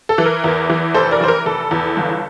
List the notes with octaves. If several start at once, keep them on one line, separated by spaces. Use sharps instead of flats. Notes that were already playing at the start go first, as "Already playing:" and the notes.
A4
E3
A#4
E2
E3
F1 A4 C5
A#4 D5
E3 C5
A#4
F1 A4
E2
G1